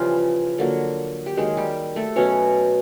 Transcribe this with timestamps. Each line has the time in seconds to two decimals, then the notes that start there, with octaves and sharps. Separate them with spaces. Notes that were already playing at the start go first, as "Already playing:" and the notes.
Already playing: C#3 E3 F3 G3 F4
0.58 D3 F#3 A#3
1.26 G4
1.37 D#3 F#3 G#3 A#3 G#4
1.57 G3 G4
1.96 A3 A4
2.16 B2 F#3 B3 C#4 C#5